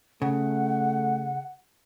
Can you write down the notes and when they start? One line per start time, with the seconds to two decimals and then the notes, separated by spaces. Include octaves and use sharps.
0.22 C#3 A3 F#5